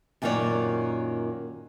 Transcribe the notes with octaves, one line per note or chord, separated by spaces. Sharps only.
F#2 A#2 D#3 F#3 C#5 D5